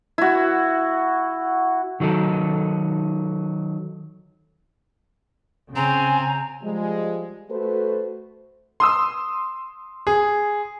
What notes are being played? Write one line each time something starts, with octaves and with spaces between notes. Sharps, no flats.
E4 F#4
D#3 F#3 D#4 A4
C#3 C4 G#5 A#5
F3 G3 G#3
A3 F#4 A4 B4 C5
C6 D#6 E6
G#4